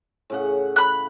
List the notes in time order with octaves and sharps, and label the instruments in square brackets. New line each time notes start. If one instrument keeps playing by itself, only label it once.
[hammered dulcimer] A2 C#3 F#5
[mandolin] B5 F#6